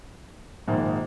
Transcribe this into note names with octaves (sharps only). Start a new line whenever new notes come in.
A#1 G#2 D#3 A#3